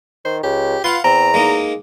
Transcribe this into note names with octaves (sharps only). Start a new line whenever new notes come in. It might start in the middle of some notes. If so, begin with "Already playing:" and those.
D#3 C5
C#2 G4
F4 B4 F5 F#5 C6
E2 C4 A#5
G#3 A#3 D#4